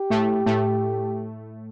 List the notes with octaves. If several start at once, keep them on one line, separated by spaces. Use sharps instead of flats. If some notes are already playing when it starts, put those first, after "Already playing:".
Already playing: G4
A2 A3
A2 A3